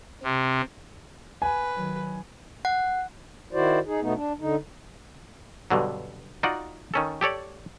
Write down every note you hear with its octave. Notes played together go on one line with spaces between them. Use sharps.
C3
B4 G#5
D#3 F#3
F#5
D#3 E4 F#4 C5 D5
D#4 G#4
B2 A3 B3 D#4
D4
D3 D#4
G2 B2 D3 F#3
D#4 F4 F#4 D5 F#5
D#3 C#4 A4
G4 A4 C#5 D5